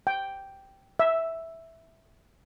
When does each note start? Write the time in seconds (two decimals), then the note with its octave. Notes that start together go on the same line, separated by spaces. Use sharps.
0.07 G5
0.99 E5